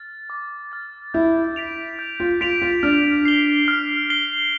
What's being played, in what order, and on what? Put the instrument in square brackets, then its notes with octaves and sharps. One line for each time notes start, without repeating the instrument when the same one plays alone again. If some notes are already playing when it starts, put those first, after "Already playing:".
Already playing: [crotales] F6 A6
D6
F6 A6
[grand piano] E4 [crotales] G6
[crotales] B6 D7 F7
G6
[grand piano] F4
[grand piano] F4 [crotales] B6 D7 F7
[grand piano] F4
[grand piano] D4 [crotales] F6
[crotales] C7 G7
F6
C7 G7